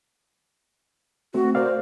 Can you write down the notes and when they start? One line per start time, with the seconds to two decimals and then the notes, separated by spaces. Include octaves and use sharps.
1.34 A3 C4 F#4
1.55 A#4 C5 D5 F5